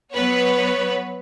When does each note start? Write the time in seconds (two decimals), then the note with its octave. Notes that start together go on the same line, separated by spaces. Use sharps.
0.13 F#3 B3 B4 C#5